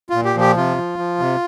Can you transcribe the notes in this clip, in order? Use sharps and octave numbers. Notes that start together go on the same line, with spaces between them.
A#2 F4
G4
F3 G4
C3 F4
F3
F3
C3